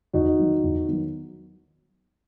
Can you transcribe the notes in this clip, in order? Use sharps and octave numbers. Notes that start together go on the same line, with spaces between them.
E2 D#4 F#4
D#3 F#3
E2
D#3 F#3